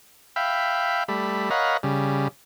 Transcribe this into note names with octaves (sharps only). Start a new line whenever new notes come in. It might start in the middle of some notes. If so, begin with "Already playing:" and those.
E5 F5 G5 B5
G3 A3 B5
A#4 C#5 D#5 F5 F#5 B5
C#3 G3